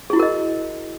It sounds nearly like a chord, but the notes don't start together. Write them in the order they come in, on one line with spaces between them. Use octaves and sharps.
G#4 E4 F#4 A#4 D#5